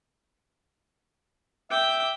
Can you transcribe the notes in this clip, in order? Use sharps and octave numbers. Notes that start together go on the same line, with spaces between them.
E5 G5 D6